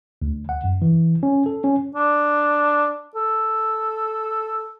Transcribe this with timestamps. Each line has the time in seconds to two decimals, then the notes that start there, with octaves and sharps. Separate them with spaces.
0.22 D2
0.49 F#5
0.64 F#2
0.82 E3
1.23 C#4
1.46 A4
1.64 C#4
1.95 D4
3.15 A4